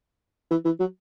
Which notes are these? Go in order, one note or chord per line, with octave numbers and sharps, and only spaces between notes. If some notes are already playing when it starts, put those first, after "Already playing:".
E3
E3
F#3